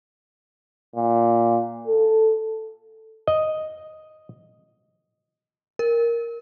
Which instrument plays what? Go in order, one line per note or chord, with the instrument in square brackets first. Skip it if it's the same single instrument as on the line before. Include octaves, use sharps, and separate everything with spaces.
[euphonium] A#2
A4
[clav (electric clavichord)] D#5
[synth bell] A#4